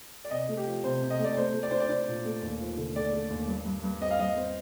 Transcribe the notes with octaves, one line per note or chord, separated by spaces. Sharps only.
D5
C3 D#5
A3
G4
F3
C3 C5
C3
D#5
A3 D5
A3 C5
A3
D5
D4 C5
D5
D4 C5
A#2
A3
D#2
F3
D3
A3 D5
A3
D#2
G2
G2
G2
C4 D#5
F5
G2 D#5
C4